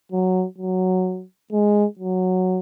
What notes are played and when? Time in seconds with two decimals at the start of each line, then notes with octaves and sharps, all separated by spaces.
0.12 F#3
0.58 F#3
1.52 G#3
1.99 F#3